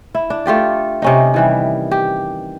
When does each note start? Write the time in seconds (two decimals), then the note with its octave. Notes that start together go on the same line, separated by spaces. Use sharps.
0.15 E4
0.30 D4
0.46 A3 F4 G4 D5
1.02 C3 C#4 D#4
1.34 D#3 E3 G3
1.91 G4